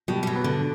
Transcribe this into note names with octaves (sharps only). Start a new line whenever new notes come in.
B2 G3
G3
F#3
B3
D3